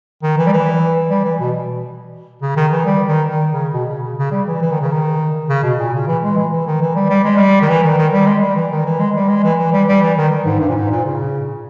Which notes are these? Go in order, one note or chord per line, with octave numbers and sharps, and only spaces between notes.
D#3
E3
G3
E3
G3
E3
B2
C#3
D#3
E3
G3
D#3
D#3
C#3
B2
C#3
C#3
C#3
G3
E3
E3
D#3
C#3
D#3
C#3
B2
A#2
C#3
E3
G#3
E3
E3
D#3
E3
G3
G3
G#3
G3
D#3
E3
D#3
D#3
G3
G#3
G3
E3
D#3
E3
G#3
G3
G#3
E3
E3
G3
G3
E3
D#3
G#2
G2
A#2
G#2
A#2
C#3